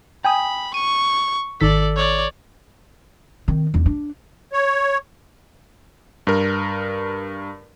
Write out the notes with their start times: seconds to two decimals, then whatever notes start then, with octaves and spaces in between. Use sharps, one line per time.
0.25 G5 G#5 B5 D#6
0.74 C#6 D#7
1.61 G#1 D#3 A4 D5 B6
1.96 C#5 D5
3.48 D#3 C4
3.74 E2 D#4
3.86 D4
4.53 C#5
6.27 G2 A#4